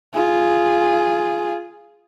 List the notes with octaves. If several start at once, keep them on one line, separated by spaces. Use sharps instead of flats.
F4 G#4